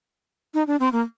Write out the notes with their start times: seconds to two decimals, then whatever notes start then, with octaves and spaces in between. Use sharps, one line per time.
0.54 D#4
0.67 D4
0.80 C4
0.92 A#3